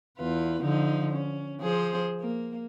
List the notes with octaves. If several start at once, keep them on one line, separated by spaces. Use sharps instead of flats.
E2 F4 B4
D3 F3 D#4
C#4
F3 G#4 C5
A#3